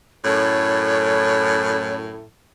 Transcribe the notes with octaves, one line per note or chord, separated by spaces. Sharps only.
F#2 A2 C#5